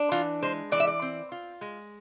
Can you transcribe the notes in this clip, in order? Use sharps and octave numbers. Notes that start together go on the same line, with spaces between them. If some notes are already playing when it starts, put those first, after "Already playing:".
Already playing: D4
E3 F4
G#3 C5
E3 D5
E5
D5
C4
F4
G#3